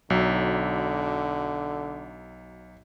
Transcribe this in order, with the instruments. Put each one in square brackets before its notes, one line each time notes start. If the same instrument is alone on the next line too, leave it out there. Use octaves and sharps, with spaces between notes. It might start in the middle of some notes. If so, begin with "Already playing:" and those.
[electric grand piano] B1 F#3 [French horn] D3